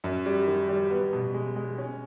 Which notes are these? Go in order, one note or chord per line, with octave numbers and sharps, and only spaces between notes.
F#2
G3
D#3
G3
B3
B2
G#3
G#3
C#4